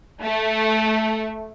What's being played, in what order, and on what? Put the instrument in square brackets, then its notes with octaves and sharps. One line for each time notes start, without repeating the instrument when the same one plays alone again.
[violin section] A3